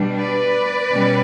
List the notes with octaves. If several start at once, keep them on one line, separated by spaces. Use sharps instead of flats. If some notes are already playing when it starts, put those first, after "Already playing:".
Already playing: B2 G3 D4
B4 D5
B2 G3 C#4